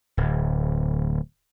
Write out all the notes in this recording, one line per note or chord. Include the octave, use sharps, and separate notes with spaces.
D1